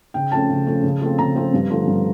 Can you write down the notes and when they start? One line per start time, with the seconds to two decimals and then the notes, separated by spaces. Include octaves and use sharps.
0.14 C#3 G5
0.32 F3 A3 C#4 A5
0.50 C#3
0.67 F3 A3 C#4
0.83 C#3
1.01 F3 A3 C4
1.19 C#3 A#5
1.36 F3 A3 C4
1.54 G2
1.70 D3 F3 A3
1.87 G2